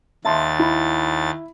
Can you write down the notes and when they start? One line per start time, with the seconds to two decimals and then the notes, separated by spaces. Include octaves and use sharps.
0.25 D#2 E5 A5 C6 A6
0.59 E4 B5